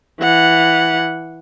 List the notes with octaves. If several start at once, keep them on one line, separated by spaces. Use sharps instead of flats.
E3 F#5